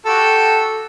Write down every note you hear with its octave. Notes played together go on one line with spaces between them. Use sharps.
F#4 G4 A4